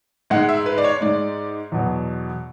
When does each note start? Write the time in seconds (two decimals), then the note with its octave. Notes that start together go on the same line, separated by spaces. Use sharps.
0.30 G#2 G#3 F#5
0.49 E5
0.66 B4
0.78 D5
0.84 C#5
1.01 G#2 G#3 D5
1.72 E2 B2 F#3